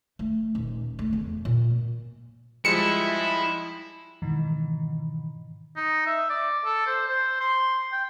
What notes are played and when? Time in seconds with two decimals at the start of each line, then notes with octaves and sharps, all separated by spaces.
0.19 A3
0.55 D#1
0.99 A3
1.13 E2
1.45 A#2
2.65 F3 G3 G#3 E4 C#7
4.22 G#2 B2 D#3 E3
5.77 D#4
6.06 E5
6.30 D5
6.65 A4
6.87 C5
7.08 C5
7.41 C6
7.92 G5